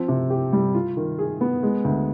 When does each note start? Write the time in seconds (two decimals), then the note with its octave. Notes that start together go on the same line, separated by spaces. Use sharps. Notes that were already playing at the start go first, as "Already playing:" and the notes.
Already playing: F3 C4
0.08 C3
0.30 G4
0.53 G3
0.74 F4
0.97 D#3
1.18 G#4
1.41 B3
1.63 G#3
1.84 D2